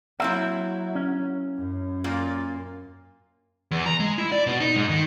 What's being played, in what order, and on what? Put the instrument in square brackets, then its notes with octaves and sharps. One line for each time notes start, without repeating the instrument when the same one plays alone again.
[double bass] F#3 [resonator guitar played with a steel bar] A#3 C4 E4 [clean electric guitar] E5
[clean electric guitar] C#4
[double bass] F#2
[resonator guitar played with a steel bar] A#2 A#3 F4
[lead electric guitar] E2
A#5
G#3
E4
D5
B2
D#4
G#2
D#3